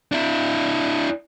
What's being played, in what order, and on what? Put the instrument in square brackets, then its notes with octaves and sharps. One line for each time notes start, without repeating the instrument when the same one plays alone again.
[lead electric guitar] D4 E4